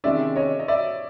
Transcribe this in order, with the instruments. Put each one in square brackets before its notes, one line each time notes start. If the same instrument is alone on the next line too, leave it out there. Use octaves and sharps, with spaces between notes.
[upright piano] C3 D#3 G#3 C#4 [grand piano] D5 E5
[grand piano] C#5 D#5
D#5
D5 E5